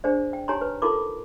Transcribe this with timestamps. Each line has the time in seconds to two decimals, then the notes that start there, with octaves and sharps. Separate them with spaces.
0.04 D4 G#4 C5 D5
0.33 G5
0.48 D#4 G4 C#5 G#5 A#5 C6
0.61 B4
0.82 D#4 F4 A4 A#4 C6 D6